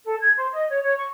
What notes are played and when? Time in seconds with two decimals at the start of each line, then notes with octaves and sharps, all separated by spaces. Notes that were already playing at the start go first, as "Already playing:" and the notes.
0.05 A4
0.20 G#6
0.37 C5
0.53 D#5
0.71 C#5
0.83 C#5
0.98 C#6